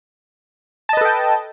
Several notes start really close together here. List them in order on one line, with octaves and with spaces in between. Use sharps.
A5 D#5 B4 A4 G5